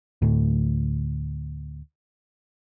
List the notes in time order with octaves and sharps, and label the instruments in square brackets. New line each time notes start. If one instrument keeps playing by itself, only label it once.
[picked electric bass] D2 A2